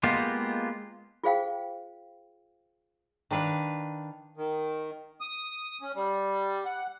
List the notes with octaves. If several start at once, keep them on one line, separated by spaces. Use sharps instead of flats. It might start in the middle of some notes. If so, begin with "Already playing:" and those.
G#3 A#3 B3 F4 G4
F4 G#4 C5 F5 G5
D#3 D4 B4 F5
D#3
D#6
C#4
G3
F#5